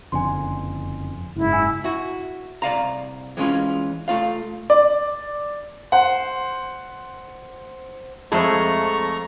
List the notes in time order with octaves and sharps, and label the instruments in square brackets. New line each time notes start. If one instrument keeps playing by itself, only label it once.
[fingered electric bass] F#1 F2 D3 [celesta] G#5 C6
[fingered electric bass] F#1 G#2 [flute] E4
[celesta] G#5 E6
[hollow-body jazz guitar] E4 F#4
C2 D5 F5 A#5
E3 G#3 C#4 F4
A3 F4 F5
[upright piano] D5
[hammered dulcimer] C5 [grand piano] F#5
[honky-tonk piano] F2 [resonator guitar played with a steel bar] G#3 [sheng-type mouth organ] A3 A#5 C#6 [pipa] A4 E5